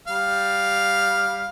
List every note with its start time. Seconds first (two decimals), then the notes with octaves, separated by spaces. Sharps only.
0.08 G3 F5